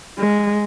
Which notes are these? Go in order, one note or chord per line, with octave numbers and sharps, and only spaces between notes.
G#3